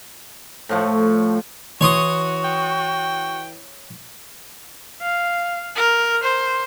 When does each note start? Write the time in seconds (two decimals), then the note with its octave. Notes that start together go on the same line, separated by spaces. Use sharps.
0.69 A2 F3 A3
1.81 E3 E4 F#4 C#5 C6 D#6
2.44 G5
5.02 F5
5.76 A#4
6.23 C5